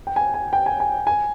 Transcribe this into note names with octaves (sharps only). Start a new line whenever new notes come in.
G5
G#5
G#5
G5
G#5
G#5
G#5